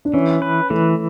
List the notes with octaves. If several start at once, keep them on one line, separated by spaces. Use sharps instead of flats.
D4
E3 C#4
B4
E3 A3